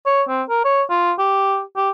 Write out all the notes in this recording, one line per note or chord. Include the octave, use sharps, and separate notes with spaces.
C#5
C4
A#4
C#5
F4
G4
G4